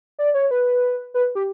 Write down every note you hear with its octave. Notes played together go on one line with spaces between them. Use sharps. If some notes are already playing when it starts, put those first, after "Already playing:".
D5
C#5
B4
B4
G4